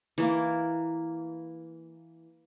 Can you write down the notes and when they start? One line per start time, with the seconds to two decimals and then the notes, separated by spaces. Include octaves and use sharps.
0.18 E3 A#3